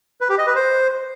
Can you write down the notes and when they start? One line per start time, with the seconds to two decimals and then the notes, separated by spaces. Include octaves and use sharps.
0.21 B4
0.30 G4
0.38 D#5
0.47 B4
0.56 C5